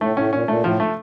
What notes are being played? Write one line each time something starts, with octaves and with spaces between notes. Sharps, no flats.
A2 A3
A2 C#4
A#2 C#4
A#2 A3
A2 F3
A3